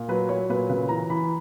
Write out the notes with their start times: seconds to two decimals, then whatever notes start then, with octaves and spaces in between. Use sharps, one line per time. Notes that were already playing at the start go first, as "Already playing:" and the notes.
Already playing: A#2
0.08 F#3 B4
0.29 F#3 C#5
0.49 A#2 B4
0.69 C#3 B4
0.89 E3 A#5
1.10 E3 B5